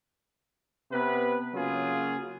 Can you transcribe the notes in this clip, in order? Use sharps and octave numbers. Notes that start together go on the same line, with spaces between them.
C3 B3 B4
C#3 F#3 A#3 F4 G#4